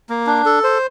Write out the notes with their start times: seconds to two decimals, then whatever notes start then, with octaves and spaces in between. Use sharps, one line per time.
0.09 A#3
0.27 D4
0.46 A4
0.64 C5